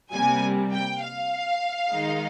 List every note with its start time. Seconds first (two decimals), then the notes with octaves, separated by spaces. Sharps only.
0.13 C3 G3 A#3 G#5
0.72 G5
1.01 F5
1.91 D#3 G#3 D#4